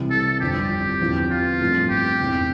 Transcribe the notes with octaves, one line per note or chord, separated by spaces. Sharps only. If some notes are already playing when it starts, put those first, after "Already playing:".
Already playing: C2 C3 E3 G3
A4
G1 F2 D3 G3 C4 G4
E2 D3 F3 C4
F4
A1 G2 F3 A3 C4
G4
F1 E2 C3